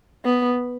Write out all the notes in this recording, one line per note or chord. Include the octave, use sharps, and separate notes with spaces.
B3